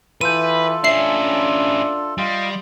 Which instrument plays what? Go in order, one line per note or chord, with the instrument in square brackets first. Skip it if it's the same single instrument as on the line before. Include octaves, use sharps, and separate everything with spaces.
[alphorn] E3 [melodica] F4 A4 [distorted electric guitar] B4 [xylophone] G6 D#7
[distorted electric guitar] C#4 E4 [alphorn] D4 [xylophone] E5 C7
[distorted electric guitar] G3 [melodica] F4 D#5 F5